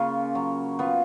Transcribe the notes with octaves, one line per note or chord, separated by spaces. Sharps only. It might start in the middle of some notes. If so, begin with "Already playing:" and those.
Already playing: C#3 A#3 F4
F#3
B3 F4